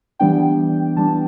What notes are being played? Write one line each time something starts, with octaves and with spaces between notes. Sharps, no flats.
E3 G3 B3 D4 G5
E3 G3 B3 D4 A5